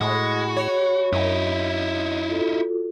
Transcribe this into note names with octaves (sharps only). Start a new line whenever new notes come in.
A2 G#3 F#4 B5
C#5
F#2 D#4 E4
F4 F#4 A4